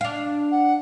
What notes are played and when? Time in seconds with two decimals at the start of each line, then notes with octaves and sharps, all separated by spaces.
0.01 D4 F5
0.52 F#5